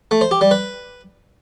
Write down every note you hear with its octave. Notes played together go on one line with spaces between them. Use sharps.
A3
C5
G4
G3
B4